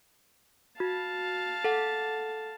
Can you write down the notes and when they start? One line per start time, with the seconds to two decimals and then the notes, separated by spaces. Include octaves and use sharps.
0.80 F#4 F5 A5
1.64 A4 F#5